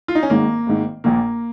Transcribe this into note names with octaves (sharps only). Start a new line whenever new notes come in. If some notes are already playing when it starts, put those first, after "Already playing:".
F4
D#4
C#4
G#1 G#2 D#3 A#3
G#1 G#2 D#3
A#1 A#2 A#3